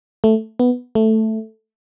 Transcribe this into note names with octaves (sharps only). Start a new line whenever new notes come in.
A3
B3
A3